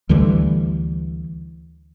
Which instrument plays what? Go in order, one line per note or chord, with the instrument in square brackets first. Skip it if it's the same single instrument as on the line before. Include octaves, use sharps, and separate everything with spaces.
[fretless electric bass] D2 D3 E3 G3